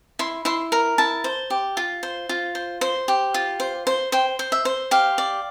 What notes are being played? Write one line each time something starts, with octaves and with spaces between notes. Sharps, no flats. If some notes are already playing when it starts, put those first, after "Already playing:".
E4 C6
E4 C6
A#4 A#5
E4 A5
C5
G4
F4
C5
F4
C5
C5
G4
F4
C5
C5
C5 G5
C5
E5
C5
G4 F5
D5